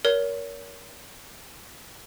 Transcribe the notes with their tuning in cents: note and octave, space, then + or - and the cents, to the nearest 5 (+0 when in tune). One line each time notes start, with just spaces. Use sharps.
A#4 +10 C#5 +30